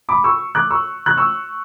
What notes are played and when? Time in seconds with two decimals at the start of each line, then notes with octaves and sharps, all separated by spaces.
0.09 B5 D6
0.24 C#6 E6
0.55 D6 F#6
0.71 C#6 E6
1.06 F#6
1.17 C#6 E6